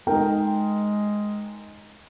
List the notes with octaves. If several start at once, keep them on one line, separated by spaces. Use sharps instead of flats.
G#3 D#4 A#4 G5